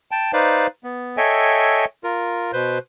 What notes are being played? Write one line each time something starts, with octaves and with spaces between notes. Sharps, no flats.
G5 A5
D#4 B4 C5 D5 F5
B3
A4 C#5 D#5 E5 G5 G#5
F4 A#4
B2 B4 C5 G6